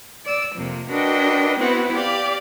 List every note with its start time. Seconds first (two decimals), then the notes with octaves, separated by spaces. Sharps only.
0.24 D5 E6
0.53 F2 C3 A#3
0.89 D4 F#4 A#4 B4 D#5 G5
1.58 B3 C4 E4 F#4 B4
1.94 G4 D5 F5